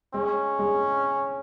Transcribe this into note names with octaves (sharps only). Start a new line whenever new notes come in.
G#3 C#4
G#3